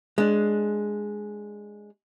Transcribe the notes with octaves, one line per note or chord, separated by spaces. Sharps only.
G#3 D4